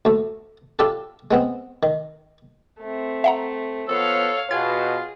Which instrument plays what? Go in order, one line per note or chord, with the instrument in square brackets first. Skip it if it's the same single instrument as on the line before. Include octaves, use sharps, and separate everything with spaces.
[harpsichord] D2 A3
D4 F4 G4 A4
G#3 B3 C4
D#3
[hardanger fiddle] A3 C4
[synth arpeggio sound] E5 F#5 A#5
[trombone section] F3 B3 [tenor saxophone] A4 [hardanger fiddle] C#5 F5
[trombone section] B2 [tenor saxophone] F4 [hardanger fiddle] G#4 [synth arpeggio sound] G#6